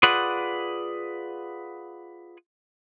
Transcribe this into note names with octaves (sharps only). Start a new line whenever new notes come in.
F4 G#4 B4 D5 F#5